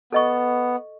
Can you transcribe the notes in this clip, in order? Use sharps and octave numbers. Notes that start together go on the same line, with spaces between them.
B3 A4 D#5 C#6